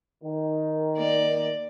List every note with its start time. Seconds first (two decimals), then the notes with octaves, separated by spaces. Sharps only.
0.24 D#3
0.96 A#3 D5